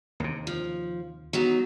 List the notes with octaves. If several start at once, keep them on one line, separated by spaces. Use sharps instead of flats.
D#2 C3
F3
F#3 B3 D#4